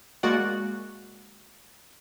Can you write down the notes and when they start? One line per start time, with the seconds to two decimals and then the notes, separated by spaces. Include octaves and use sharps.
0.23 G#3 A#3 F#4 D5 F#5